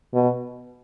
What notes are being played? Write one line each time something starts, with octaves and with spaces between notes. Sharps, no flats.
B2